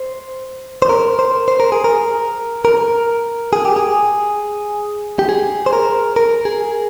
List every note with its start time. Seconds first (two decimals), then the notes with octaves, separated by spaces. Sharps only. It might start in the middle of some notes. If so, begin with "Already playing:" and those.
Already playing: C5
0.82 C5
0.89 A#4
1.19 C5
1.48 C5
1.60 A#4
1.72 G#4
1.84 A#4
2.65 A#4
3.53 G#4
3.65 G4
3.76 G#4
5.19 G4
5.29 G#4
5.66 C5
5.73 A#4
6.16 A#4
6.45 G#4